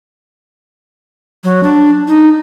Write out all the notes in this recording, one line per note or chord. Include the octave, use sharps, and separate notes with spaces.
F#3
D4
D#4